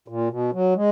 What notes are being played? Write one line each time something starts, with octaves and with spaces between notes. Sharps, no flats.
A#2
B2
F#3
G#3